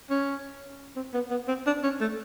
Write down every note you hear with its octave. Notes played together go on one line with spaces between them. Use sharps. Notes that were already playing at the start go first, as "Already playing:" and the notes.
C#4
C4
B3
B3
C4
D4
C#4
A3